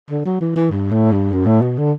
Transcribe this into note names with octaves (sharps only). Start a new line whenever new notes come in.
D3
F#3
E3
E3
G2
A2
G2
F#2
A2
B2
D3